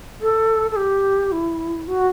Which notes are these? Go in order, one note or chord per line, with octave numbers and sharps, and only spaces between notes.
A4
A4
G4
E4
F#4